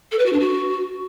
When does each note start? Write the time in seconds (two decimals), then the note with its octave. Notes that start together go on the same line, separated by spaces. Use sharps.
0.11 A4
0.18 B4
0.25 F#4
0.32 D4
0.39 F#4